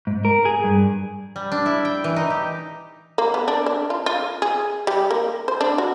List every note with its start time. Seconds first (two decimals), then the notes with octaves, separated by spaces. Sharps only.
0.07 G#2
0.25 A#4
0.45 G#4
0.64 G2
1.36 G3
1.52 D4
1.66 E4
1.85 G5
2.04 E3
2.16 D#4
2.30 G4
3.18 A#3
3.34 B3
3.48 D4
3.66 D4
3.90 F4
4.06 F4
4.42 G#4
4.87 G3
5.11 A#3
5.48 C5
5.61 D4
5.78 F#4